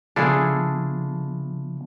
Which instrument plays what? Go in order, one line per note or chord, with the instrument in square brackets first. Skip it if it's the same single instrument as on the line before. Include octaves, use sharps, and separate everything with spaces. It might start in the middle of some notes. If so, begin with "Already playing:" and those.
[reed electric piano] C#3 F3 B3 [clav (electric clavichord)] D4 E4 F4 [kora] G#4 A4